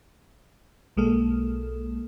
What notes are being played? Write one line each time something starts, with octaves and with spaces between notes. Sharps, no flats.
B1 G#3 A#3 A4